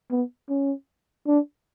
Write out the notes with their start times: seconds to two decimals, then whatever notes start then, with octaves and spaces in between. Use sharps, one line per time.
0.11 B3
0.49 C#4
1.27 D4